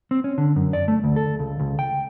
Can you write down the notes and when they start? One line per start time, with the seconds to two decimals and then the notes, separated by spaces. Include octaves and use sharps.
0.11 C4
0.24 C#4
0.38 D3
0.56 F#2
0.73 D5
0.88 A3
1.04 D2
1.16 A4
1.39 C#2
1.60 C#2
1.79 G5